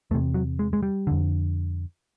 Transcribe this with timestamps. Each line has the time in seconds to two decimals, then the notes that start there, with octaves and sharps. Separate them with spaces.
0.11 E2 A3
0.14 C3
0.34 F#3
0.59 G#3
0.73 G#3
0.83 G3
1.07 F2 D3